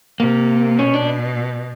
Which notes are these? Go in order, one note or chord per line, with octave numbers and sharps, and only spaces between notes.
C3 A#3
B2 C#4
D4